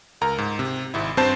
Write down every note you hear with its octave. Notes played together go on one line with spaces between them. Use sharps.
C#2 A#4 A#5
G#2
C3
G#1 G#2 E4
G2 C4 C5 A5